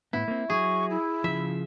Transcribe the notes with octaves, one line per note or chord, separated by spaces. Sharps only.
A2 C3 B3 E4
A#3 C4
F#3 G#4 C#6
E4
C#3 F3 E5